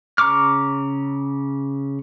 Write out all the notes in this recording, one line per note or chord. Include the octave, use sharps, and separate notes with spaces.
C#3 A#5 C#6 D6 F6